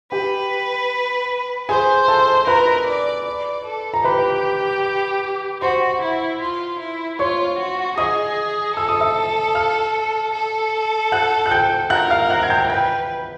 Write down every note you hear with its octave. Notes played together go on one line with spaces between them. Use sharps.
G4 B4 G5
G#4 C5 G#5
A4 A5
A#4 B4 B5
D5
D5
A4
A#5
G4 B4 B5
F#4 C5 C6
E4
F4
E4
F4 C#5 C#6
F#4
G#4 D#5 D#6
A4 E6
D#6
E5 E6
F5 F6
A4
F#5 F#6
F#6
G5 G6
A#4 F#5 F#6
F5 F6
F#5 F#6
G#6
G5 G6
B4 G5 G6